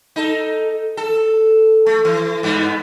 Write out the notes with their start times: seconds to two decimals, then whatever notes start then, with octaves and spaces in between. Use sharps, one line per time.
0.16 D#4 A4
0.97 A4
1.86 A3
2.05 E3
2.43 G2 B3